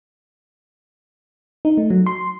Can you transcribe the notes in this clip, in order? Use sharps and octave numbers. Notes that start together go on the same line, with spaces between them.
D#4
A3
F#3
C6